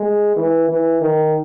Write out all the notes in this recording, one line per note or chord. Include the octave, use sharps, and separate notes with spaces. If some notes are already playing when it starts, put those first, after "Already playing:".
Already playing: G#3
E3
E3
D#3